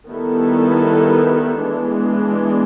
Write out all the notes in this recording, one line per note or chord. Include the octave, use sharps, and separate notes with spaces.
D#3 G3 B3 E4 A4
E3 G#3 B3 D4